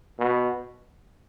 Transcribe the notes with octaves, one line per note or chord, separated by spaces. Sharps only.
B2